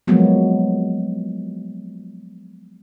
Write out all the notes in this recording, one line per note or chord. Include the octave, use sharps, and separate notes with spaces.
F3 F#3 G#3 A#3 B3